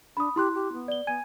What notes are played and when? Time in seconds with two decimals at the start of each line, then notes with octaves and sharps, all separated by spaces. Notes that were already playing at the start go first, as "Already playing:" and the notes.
0.17 D4 B5 D#6
0.36 E4 G4 C6 F#6
0.54 G4
0.73 B3
0.88 D5 G7
1.07 B3 G#5 G#6 D#7